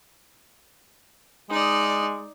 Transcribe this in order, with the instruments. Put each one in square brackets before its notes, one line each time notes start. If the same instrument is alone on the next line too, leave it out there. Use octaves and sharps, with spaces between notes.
[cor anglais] G#3 [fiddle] D#4 D5